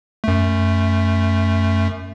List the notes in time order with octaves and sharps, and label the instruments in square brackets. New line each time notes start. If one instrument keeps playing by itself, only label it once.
[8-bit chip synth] F#2 A3